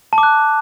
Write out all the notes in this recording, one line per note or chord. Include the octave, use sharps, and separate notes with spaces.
A5
D6
F#6